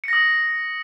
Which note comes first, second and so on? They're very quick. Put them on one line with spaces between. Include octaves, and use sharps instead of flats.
C#7 A#6 D#6